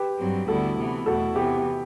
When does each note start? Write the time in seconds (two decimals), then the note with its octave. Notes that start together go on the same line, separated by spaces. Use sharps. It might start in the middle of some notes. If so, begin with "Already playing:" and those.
Already playing: G4 B4
0.18 G2 F#3 C4
0.47 D2 D3 G3 B3 E4 F#4 A4
0.78 C3 E3 B3
1.06 E2 B2 A3 E4 F#4 A4
1.36 C3 E3 B3 G4